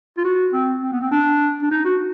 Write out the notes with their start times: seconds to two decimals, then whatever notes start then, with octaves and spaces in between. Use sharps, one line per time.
0.18 F4
0.25 F#4
0.53 C4
0.82 C4
0.92 B3
1.01 C4
1.12 D4
1.62 D4
1.71 D#4
1.85 F#4